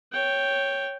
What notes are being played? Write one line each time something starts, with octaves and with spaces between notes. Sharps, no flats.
C#5 G5